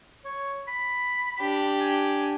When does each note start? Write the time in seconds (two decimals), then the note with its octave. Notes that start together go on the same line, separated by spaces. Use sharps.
0.25 C#5
0.68 B5
1.40 D4 G4
1.80 G#5